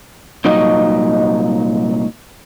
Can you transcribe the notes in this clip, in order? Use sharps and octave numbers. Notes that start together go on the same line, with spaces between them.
C2 A#2 F#3 D#4 D#5